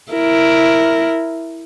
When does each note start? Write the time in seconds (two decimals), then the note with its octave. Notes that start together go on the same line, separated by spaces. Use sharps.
0.12 E4 A#4